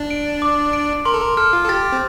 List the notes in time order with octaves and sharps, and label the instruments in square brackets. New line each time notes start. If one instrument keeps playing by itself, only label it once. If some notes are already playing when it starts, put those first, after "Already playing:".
Already playing: [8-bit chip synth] D4
[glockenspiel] D7
D6
D7
[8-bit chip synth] A#4 [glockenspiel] C6
[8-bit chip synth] A4
A#4
[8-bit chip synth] A4 [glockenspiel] F6
[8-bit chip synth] F4
A4
[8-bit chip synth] G4 [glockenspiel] A6
[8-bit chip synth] C4